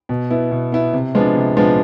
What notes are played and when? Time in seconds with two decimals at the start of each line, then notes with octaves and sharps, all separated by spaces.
0.09 B2
0.30 B3 E4
0.51 B2
0.72 B3 E4
0.93 C3
1.15 F3 G#3 B3 D4
1.35 C3
1.57 F3 G#3 B3 D4